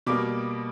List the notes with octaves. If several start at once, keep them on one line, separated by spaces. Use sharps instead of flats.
B2 G3 A#3 D6